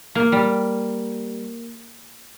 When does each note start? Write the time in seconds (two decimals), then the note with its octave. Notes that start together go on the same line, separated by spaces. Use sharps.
0.15 A#3
0.32 G3